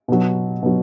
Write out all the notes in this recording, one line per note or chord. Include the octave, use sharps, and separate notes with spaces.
B2 F#3
B2 F#3